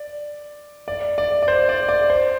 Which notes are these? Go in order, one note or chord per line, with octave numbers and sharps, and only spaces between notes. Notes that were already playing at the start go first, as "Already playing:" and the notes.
Already playing: D5
D5
D5
D5
C5
D5
D5
C5